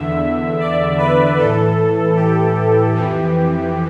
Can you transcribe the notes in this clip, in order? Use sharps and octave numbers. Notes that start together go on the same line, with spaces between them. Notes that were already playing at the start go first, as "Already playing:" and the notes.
Already playing: E2 D3 E5
D5
B4
A2 E3 A4
G4
F2 E3